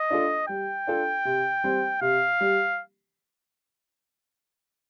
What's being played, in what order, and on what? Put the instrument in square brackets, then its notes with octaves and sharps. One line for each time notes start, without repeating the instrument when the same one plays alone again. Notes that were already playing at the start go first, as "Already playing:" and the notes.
Already playing: [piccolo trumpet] D#5
[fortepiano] D4 F4 A4
[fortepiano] G3 [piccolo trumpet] G5
[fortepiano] D4 F4 A4
C3
G3 C4
[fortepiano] C3 [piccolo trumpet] F5
[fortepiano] G3